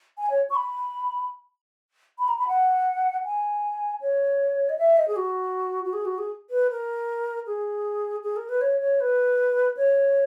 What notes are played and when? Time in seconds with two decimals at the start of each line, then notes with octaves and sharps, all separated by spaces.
0.18 G#5
0.30 C#5
0.50 C#6
0.55 B5
2.19 B5
2.28 A#5
2.38 B5
2.48 F#5
3.24 G#5
4.01 C#5
4.69 D#5
4.78 E5
4.97 D#5
5.08 G#4
5.16 F#4
5.84 F#4
5.93 G#4
6.05 F#4
6.18 G#4
6.50 B4
6.70 A#4
7.47 G#4
8.23 G#4
8.36 A#4
8.49 B4
8.61 C#5
8.80 C#5
9.00 B4
9.77 C#5